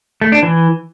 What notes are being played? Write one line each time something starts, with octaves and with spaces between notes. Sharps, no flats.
A3
D4
E3